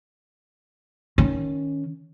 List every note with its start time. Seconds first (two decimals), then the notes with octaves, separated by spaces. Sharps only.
1.18 D#3 C#4